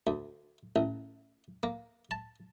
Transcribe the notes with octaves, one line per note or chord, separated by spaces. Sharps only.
D2
A1
A#3
A5